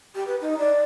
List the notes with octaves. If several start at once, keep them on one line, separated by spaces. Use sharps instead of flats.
G4
B4
D#4
D5